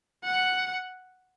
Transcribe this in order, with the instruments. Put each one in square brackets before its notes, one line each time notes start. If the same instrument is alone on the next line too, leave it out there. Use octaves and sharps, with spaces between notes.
[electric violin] F#5